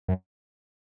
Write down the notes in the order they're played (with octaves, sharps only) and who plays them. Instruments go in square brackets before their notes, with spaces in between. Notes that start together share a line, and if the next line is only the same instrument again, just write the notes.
[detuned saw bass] F#2